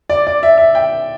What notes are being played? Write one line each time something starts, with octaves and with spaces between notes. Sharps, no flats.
D5
D5
E5
E5
G5